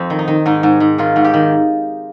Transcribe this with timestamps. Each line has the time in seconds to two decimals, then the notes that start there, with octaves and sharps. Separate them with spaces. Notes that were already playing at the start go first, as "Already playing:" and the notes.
Already playing: F2 C4
0.10 D#3
0.19 D#4
0.28 D#3
0.46 G#2 D#4
0.63 G#2
0.80 G#2
0.98 D#3 F4
1.16 G#2
1.24 G4
1.34 D#3